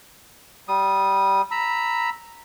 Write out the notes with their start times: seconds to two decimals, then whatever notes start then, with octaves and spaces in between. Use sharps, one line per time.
0.68 G3 D#6
1.51 A#5 B5 E6